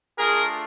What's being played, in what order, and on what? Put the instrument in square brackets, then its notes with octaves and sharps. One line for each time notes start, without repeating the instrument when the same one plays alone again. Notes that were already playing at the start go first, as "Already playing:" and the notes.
[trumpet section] A3 D4 F4 G#4 A#4